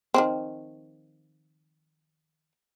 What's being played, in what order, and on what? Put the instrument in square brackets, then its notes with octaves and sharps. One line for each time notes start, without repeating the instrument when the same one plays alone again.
[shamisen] D#3 F3 C4